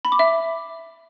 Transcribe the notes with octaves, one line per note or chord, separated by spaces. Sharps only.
B5
D6
E5